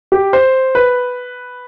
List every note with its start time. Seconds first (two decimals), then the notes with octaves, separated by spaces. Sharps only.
0.12 G4
0.33 C5
0.75 B4